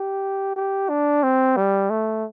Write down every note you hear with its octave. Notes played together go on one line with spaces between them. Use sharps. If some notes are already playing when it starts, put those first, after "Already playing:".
Already playing: G4
G4
D4
C4
G3
A3